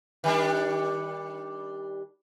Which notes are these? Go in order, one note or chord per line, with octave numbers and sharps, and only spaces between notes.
D#3 G3 D4